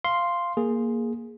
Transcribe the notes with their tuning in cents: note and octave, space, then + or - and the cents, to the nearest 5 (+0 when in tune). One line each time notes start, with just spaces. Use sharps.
F5 -10 C6 +0
A#3 +0 G#4 +0